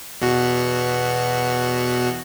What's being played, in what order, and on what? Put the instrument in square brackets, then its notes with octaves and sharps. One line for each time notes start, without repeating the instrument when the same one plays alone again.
[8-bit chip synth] E2 B2 F#4